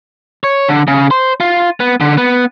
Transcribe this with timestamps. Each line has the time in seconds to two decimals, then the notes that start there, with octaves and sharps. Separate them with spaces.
0.44 C#5
0.69 D3
0.88 C#3
1.11 C5
1.40 F4
1.80 B3
2.01 D3
2.18 B3